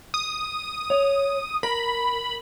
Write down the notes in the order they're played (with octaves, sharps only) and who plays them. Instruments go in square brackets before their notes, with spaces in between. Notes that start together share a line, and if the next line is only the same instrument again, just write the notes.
[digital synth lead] D#6
[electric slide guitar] C#5
[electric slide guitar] A#4 [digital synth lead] B5